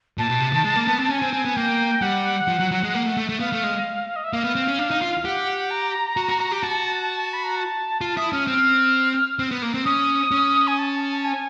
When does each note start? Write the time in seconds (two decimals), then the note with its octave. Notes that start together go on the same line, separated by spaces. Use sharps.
0.18 A#2 A5
0.30 B2
0.40 C3
0.53 D#3
0.64 G#3
0.76 A#3
0.88 B3
0.99 C4
1.10 C#4 G#5
1.22 C4
1.33 C4
1.45 B3
1.56 A#3 G5
2.02 G3 F#5
2.48 F3
2.60 F#3
2.71 F#3
2.84 G#3
2.95 A#3
3.06 A3
3.17 A3
3.29 A3
3.40 B3 F5
3.53 A3
3.64 G#3
4.16 D#5
4.24 E5
4.33 A#3 F5
4.44 B3
4.55 C4
4.68 C#4
4.79 D4
4.91 D#4
5.01 F4
5.25 G4 F#5
5.70 A#5
6.17 F#4
6.29 F#4
6.41 F#4
6.52 G4
6.63 F#4 A5
7.33 B5
7.44 A#5
7.56 A5
8.01 F4 A5
8.17 E4 D#6
8.33 C#4 F6
8.47 C4 F6
9.39 C4
9.51 B3
9.62 A#3
9.74 C4
9.85 C#4 D#6
10.31 C#4
10.67 G#5
10.79 A5
11.24 G#5